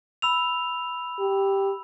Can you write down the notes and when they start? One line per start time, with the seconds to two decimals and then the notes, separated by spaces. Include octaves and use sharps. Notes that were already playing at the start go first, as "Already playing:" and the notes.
0.22 B5 E6 F7
1.20 G4